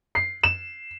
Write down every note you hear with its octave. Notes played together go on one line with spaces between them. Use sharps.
C7
E7